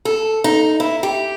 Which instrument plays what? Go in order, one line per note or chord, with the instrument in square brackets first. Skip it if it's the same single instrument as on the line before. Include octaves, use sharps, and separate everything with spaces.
[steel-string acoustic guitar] A4
D#4
E4
G4